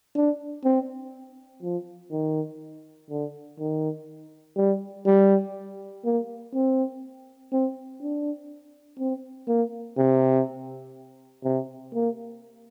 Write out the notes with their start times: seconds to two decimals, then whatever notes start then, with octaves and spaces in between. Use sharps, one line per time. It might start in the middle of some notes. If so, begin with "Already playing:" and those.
0.16 D4
0.65 C4
1.62 F3
2.11 D#3
3.10 D3
3.60 D#3
4.57 G3
5.06 G3
6.05 A#3
6.54 C4
7.52 C4
8.02 D4
8.99 C4
9.48 A#3
9.97 C3
11.45 C3
11.94 A#3